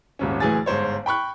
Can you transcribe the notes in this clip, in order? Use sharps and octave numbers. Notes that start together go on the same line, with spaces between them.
D#1 G#1 C#4
D2 A2 E3 G#4 G#5 A6
G1 G#2 C5 C#5
G5 B5 C#6 F#6